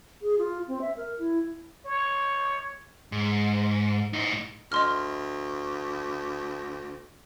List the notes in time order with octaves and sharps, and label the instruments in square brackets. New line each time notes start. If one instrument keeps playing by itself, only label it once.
[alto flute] G#4
F4
C4
E5
A#4
E4
[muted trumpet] C#5
[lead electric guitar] G#2
A2 D#4
[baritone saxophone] D2 [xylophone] D#5 C6 F6